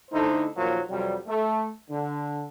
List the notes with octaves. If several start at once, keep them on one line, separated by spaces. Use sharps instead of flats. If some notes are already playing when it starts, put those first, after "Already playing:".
D3 A3 D#4 E4 A4 C5
D#2 A#2 F3 F#3 A#3
F2 C3 F#3 G3
A3
D3